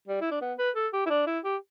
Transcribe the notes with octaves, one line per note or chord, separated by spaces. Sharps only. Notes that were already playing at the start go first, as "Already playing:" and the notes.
G3
E4
D4
B3
B4
A4
G4
E4
D4
E4
G4